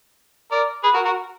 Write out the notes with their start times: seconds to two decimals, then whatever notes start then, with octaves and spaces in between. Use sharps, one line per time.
0.52 A#4 D5
0.83 G#4 B4
0.94 F#4 A#4
1.05 F#4 A#4